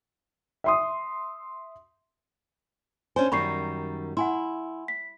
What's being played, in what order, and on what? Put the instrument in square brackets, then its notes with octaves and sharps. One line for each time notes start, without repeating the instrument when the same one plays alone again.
[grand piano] E5 C6 D#6
[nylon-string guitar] C#4 D4 C5 [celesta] G#5
[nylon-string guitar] F#2 D#3 G3 [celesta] B5 C#6 C7
[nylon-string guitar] E4 [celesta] F#5 G#5 C6
[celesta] B6